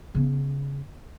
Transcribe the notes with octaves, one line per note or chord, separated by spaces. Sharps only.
C#3 B3